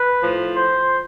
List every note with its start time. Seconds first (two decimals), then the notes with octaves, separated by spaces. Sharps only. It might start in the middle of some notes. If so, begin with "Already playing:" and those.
Already playing: B4
0.21 A2 F3
0.55 C5